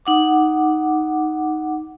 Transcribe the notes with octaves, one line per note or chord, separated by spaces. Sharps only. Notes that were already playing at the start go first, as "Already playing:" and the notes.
D#4 F#5 D6